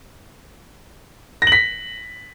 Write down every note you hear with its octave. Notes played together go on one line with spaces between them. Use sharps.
A#6
F#7
B6